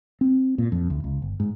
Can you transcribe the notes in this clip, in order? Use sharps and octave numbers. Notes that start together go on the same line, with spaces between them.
C4
A#2
F2
D2
C#2
G1
G#2